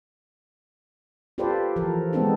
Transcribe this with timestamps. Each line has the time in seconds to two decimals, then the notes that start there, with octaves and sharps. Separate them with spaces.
1.38 F4 G4 A4 B4 C5 D5
1.76 E3 F3 A4 A#4
2.13 G#3 B3 C4 D4 D#4 A4